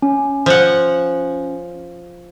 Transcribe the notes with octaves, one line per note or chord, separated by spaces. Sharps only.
C#4
F3 F#5